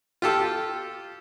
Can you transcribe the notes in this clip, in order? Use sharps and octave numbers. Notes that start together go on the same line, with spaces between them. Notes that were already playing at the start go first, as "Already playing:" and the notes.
F4 G4 A4